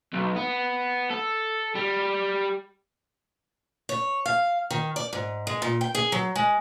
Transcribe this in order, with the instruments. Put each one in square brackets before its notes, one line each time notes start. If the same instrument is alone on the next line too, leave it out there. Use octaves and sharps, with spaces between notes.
[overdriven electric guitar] B1
B3
A4
G3
[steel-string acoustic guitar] C#5
F5
D#3
D5
G#2
G#3
A#2
G5
G#4
F#3
G#3